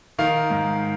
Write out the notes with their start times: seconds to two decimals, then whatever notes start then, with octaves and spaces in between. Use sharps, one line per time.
0.19 D#3 F5
0.50 G#2